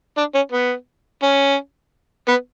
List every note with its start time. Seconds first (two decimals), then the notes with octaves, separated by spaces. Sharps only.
0.17 D4
0.35 C#4
0.52 B3
1.23 C#4
2.28 B3